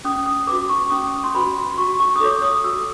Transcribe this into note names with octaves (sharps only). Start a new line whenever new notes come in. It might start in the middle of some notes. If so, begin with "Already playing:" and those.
C#4 D#6
D#6
F#4 B4 D6
C#6
C#4 D#6
C6
F#4 B4 B5
C6
F#4 C#6
C#6
D#6
A4 C#5 D6
D#6
F#4 E6